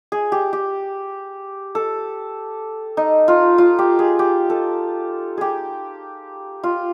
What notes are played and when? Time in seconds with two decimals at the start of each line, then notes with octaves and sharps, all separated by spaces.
0.12 G#4
0.32 G4
0.53 G4
1.75 A4
2.97 D#4
3.28 F4
3.58 F4
3.79 G4
3.99 G#4
4.19 G4
4.50 A4
5.38 G4 G#4
6.64 F4